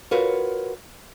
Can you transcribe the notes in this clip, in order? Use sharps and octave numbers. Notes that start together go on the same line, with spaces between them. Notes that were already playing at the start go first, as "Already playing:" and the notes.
F4 F#4 A#4 B4 C#5